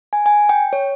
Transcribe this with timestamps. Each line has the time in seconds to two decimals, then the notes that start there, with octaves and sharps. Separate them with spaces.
0.13 G#5
0.26 G#5
0.49 G5
0.73 C#5